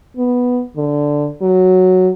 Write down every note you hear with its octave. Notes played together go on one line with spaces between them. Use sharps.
B3
D3
F#3